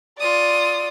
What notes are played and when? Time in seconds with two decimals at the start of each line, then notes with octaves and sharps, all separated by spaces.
0.20 F4 D5 D#6